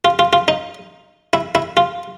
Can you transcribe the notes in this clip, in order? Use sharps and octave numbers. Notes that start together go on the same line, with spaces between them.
F4
F4
F4
D#4
E4
E4
F4